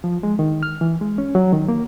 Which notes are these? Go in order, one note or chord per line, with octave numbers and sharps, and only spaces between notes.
F3
G#3
D#3
F6
E3
G#3
C#4
F#3
D#3
A#3